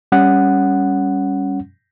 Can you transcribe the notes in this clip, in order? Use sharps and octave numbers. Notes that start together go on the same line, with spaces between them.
G3 C#4 F#5